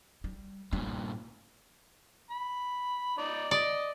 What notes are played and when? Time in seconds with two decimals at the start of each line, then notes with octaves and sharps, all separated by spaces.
0.24 G3
0.73 G2 A#2 C#4
2.31 B5
3.18 D#4 D5
3.51 D5 D#5